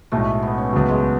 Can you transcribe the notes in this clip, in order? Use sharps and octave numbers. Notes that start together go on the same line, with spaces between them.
B1 A2 G#3 A3
B3
C#4
C#2 C#3 F#3 B3
G#3